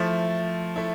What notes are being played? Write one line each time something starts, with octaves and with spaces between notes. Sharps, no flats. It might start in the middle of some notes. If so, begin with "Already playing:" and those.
Already playing: F3 A3 E4
A3 E4